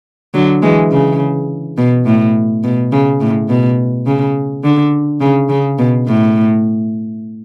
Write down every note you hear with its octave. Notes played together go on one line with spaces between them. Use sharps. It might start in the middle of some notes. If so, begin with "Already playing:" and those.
D3 F#3
E3 G#3
C#3
B2
A2
B2
C#3
A2
B2
C#3
D3
C#3
C#3
B2
A2